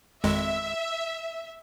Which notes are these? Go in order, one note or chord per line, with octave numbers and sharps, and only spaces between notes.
G#1 F2 G#3 E5